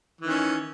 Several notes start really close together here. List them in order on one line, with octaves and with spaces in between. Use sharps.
E3 D#3 C#4